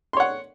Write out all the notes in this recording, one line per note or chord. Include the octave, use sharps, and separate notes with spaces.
C#5 F#5 C6